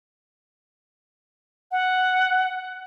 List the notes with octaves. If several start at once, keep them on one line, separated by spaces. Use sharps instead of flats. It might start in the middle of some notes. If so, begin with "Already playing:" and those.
F#5